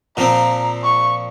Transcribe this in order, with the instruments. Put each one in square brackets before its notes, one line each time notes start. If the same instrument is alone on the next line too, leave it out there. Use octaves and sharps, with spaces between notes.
[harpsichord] A#2 F3 C4 [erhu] A#5
[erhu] C#6